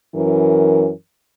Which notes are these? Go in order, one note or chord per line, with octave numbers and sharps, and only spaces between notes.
F#2 E3 A#4